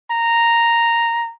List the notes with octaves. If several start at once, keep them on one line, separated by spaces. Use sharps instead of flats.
A#5